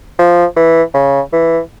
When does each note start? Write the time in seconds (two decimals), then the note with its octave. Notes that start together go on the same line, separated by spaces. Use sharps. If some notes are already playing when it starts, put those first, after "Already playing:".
0.19 F3
0.56 E3
0.94 C#3
1.33 E3